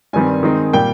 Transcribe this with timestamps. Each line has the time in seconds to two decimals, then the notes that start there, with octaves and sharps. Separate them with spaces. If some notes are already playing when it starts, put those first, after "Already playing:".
0.13 G2 D#3 G3 C4 G#5
0.43 D#3 G#3 C4 D#4
0.73 A#2 G3 A#3 G5